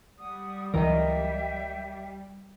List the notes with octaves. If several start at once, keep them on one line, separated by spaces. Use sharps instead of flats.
G3 F#5 D#6
C#2 E3 F#3 A#4 D#5 E5 G5